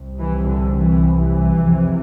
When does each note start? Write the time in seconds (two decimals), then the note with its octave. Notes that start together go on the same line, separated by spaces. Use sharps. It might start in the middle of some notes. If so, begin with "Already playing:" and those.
Already playing: C2 C3
0.18 E3
0.47 D3
0.76 E3
1.18 E3
1.62 F1 F2 C3